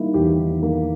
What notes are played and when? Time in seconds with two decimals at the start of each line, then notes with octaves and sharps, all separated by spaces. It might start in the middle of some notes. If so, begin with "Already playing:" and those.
Already playing: D#3 G3 A#3 D#4 E4
0.14 E2 G4
0.39 D#3
0.62 A#3